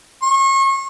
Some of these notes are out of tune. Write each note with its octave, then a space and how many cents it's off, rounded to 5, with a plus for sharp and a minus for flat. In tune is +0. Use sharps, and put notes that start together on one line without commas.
C#6 -35